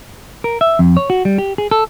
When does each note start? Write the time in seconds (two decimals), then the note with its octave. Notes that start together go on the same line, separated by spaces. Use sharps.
0.44 A#4
0.61 E5
0.79 F2
0.97 C#5
1.10 F#4
1.25 G3
1.38 G4
1.58 G#4
1.71 A4